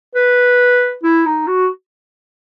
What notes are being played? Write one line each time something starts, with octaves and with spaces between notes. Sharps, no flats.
B4
E4
D#4
F#4